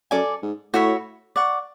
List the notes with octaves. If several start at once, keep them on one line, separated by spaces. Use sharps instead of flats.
F#2 A4 D5 G#5
G#2
A2 F#4 C#5 E5 B5
D5 F#5 C#6